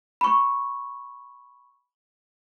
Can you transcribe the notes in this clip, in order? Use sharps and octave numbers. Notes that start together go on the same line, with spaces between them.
B5 C#6